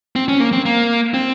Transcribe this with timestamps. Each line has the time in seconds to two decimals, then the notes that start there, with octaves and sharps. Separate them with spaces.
0.16 C4
0.28 C#4
0.40 A#3
0.53 C4
0.65 A#3
1.14 C4